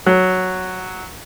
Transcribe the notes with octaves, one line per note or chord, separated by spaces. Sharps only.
F#3